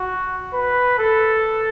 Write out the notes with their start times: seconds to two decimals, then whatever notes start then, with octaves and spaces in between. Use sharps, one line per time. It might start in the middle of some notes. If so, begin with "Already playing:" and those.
Already playing: F#4
0.53 B4
0.99 A4